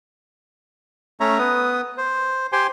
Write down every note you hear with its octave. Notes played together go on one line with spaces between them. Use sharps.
A3 C#4 C#5 E5 A#5
B3 B4 D#6
C5
G4 C5 G5 G#5 C6